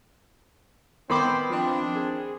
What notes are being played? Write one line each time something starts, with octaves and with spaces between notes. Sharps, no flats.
D#3 B3 C4 C5 B5 D6
F3 C4 D4
G#4